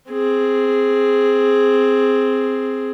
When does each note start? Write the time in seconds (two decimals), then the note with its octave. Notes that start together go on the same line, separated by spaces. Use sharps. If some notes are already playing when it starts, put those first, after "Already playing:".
0.10 C4 G#4